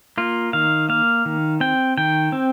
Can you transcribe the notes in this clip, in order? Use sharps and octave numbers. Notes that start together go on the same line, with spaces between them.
A#3 F4
D#3 F5
A#3 F5
D#3
C4 G5
D#3 G5
C4